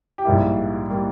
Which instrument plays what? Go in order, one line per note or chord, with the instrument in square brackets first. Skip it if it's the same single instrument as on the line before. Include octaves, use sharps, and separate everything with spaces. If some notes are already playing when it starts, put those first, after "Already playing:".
[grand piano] G4
A#1 G#2 G3 A#3 E4
G3 A#3